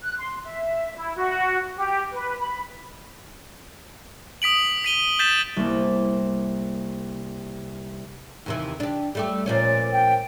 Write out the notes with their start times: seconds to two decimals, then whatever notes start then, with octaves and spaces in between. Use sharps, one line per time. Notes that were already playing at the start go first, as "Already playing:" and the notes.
0.02 F#6
0.17 C6
0.44 E5
0.96 E4
1.16 F#4
1.76 G4
2.11 B4
2.40 B5
4.42 D#6 B6 D7 F#7
4.84 B6 D#7 G7
5.19 G6 A6 B6 E7
5.56 C2 A#3
8.46 D#2 C3 E3
8.80 D4 G4
9.15 G3 A3 G4
9.46 A#2 F3 C#4 D5
9.91 G5